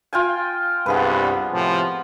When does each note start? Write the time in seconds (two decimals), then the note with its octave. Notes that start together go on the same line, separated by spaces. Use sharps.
0.13 F4 G5 G#5
0.86 C2 G2 B3 G#4 B4
1.52 A2 C3 F3